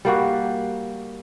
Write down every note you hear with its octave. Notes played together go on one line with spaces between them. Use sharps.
G3 A#3 F#4